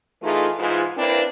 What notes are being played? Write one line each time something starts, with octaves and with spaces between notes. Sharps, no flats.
E3 A3 D#4 F4 G#4
G#2 E3 F4
A#3 C4 D4 E4 B4